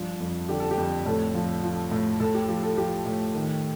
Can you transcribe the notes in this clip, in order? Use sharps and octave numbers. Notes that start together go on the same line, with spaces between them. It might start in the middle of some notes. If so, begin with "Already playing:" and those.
Already playing: G2 F3
F2
D3 G4
A4
G4
F2
A2 A4
F3
F3
A2
A2 A4
G4
F3 G4
A4
F3 G4
A2
D#3